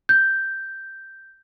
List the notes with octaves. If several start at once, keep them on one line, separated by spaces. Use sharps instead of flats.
G6